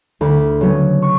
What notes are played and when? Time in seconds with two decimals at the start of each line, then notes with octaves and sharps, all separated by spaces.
0.21 D2 B5
0.61 C#3 F#3 B3
1.02 C#6